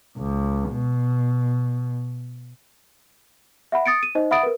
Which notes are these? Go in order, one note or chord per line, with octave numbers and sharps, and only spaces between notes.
C#2
B2
E5 F#5 B5
D#6 A6 C#7 D7
D#7
D#4 C5 D#5
E5 F#5 B5 D#6 A6 D7
A#4 B4